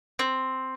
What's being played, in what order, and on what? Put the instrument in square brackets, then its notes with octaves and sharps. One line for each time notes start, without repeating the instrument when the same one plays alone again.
[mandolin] C4